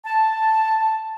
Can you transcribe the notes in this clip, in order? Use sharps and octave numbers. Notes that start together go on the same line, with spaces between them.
A5